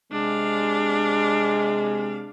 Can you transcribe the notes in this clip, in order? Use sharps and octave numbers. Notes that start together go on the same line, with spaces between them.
C3 G#3 D4 F5